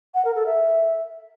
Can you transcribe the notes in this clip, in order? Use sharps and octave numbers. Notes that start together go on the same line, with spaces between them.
F#5
A#4
A4
E5